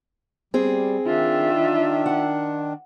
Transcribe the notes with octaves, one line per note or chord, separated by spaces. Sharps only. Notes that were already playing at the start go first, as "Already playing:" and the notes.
G3 C4 G#4
D#3 D4 F4 E5
F#5